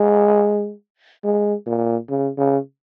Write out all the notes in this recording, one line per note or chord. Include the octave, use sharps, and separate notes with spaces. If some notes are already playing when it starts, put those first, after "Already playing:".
Already playing: G#3
G#3
A#2
C#3
C#3